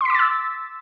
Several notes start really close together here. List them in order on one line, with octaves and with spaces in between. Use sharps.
C6 B6 D6 A6 E6